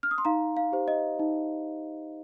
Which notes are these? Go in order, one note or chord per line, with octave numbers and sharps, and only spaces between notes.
F6
D#6
C6
D#4 F5 A#5
F5
G4 C5
D#5
D#4